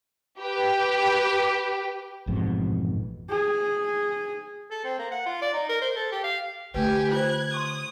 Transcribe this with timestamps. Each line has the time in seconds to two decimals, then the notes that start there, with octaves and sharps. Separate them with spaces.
0.39 G4 B4
2.27 A1 F2 G#2 B2
3.30 G#4
4.70 A4
4.84 C4
4.99 A#3
5.11 F#5
5.26 F4
5.41 D5
5.53 D#4
5.69 A#4
5.81 C5
5.96 A4
6.11 G4
6.24 F5
6.74 D3 A3 G4 B4 G#5
7.12 F4 C5 F#6 G#6
7.54 C6 C#6 D#6